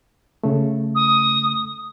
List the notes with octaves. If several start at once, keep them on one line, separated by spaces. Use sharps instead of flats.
C#3 A3
D#6